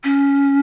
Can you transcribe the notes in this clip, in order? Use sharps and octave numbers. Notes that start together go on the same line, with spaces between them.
C#4